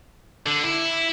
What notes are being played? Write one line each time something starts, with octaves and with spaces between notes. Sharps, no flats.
D3
E4